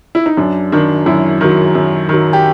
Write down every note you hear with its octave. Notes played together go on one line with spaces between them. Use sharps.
E4
D#4
F#2 D4
D#3 F#3 D4
F#2 E4
D#3 F#3
F#2
D#3 F#3
G4